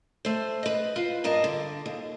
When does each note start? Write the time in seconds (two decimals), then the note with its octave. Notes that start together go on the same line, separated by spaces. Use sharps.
0.25 A3 C5
0.63 B4 D#5
0.96 F4 B4 C5
1.24 G2 A#4 D#5 A5
1.44 D3
1.86 D#2